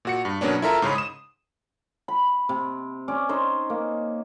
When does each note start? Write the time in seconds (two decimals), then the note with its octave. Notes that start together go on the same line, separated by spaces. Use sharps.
0.05 A#2 F#4 C#7
0.25 G2
0.41 B2 F#3 A#3 B3 C#4 D4
0.62 E4 F4 A4 A#4 E5 A#5
0.82 G#2 C#3 C#4 B5
0.95 D#6 E7
2.08 B5
2.49 C3
3.08 C#4 D5
3.29 C#4 D#4 C5 D#5
3.70 A#3